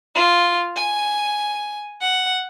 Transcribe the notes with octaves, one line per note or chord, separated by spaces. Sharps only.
F4
G#5
F#5